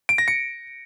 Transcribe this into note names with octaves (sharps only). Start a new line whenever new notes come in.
D7
A#6
C#7